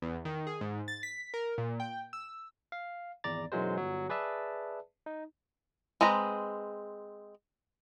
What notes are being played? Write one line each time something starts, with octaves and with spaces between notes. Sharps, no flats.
E2
D#3
G#4
G#2
A6
B6
A#4
A#2
G5
E6
F5
G#1 E2 D5 A#5 A6
B1 F#2 E3 F#3 G#3 C5
G1 F#3
G#4 B4 D5 E5 A5
D#4
G#3 C4 B4 A#5